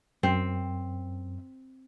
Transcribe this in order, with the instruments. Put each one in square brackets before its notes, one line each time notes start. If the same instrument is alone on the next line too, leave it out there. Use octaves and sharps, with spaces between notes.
[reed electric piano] F#2 [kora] C4